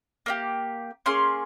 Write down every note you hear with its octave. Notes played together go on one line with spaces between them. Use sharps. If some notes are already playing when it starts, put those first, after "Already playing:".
A#3 D#4 G4
A#3 C#4 G#4 C6